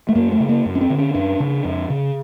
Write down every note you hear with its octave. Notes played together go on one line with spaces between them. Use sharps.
A3
F#2 A#3
A3
C#3
A#3
F#2
C#4
C4
D3
C#4
F#2 D4
C#3
F2
C#3